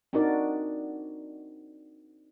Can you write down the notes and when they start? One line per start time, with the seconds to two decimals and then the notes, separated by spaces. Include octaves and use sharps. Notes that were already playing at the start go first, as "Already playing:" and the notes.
0.13 C4 D4 D#4 F#4 A#4 D5